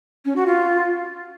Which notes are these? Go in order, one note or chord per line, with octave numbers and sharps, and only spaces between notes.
C#4
F#4
F4